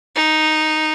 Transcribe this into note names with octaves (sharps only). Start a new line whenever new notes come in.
D#4